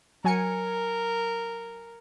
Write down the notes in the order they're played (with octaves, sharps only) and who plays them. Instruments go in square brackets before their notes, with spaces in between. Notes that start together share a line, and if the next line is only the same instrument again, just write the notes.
[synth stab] F#3 G#5 C#7 [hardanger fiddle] A#4